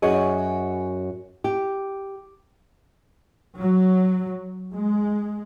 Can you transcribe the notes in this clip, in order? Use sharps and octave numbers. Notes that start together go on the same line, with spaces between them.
F#2 F#4 G#4 C#5 D#5
G4
F#3
G#3